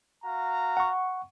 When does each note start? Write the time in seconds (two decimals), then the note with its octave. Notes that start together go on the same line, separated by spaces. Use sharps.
0.24 F#4 F5 A#5
0.77 F#5 C#6